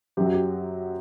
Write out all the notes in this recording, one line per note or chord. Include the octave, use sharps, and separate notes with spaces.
F#2 F#3 G4
F#4
G4